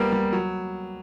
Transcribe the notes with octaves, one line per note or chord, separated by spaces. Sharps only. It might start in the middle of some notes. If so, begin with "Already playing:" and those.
Already playing: G3 A#3 B3
G3
F#3